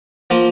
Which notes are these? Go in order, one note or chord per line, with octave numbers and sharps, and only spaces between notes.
F3 A#3 F4